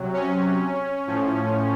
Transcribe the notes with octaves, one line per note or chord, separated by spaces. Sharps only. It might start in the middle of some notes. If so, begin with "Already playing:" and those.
Already playing: C3 F#3
C#4
A2 F3